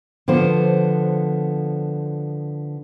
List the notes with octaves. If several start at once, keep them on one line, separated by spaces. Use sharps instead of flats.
D3 F3 B3 C5